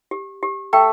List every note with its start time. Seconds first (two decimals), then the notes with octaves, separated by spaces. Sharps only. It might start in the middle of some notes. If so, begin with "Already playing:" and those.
0.11 G4
0.43 G4
0.73 A3 G5